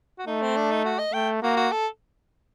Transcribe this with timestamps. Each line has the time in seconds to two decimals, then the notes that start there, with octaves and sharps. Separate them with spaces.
0.19 F#4
0.27 A3 D#4
0.42 C4
0.57 D4
0.71 D#4
0.85 F#4
0.99 D#5
1.13 A3 G5
1.42 A#3 F#4
1.57 F#4
1.72 A4